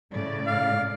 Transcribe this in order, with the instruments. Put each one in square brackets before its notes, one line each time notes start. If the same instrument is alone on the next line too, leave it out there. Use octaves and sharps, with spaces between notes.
[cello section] A2 C#3 D5
[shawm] F5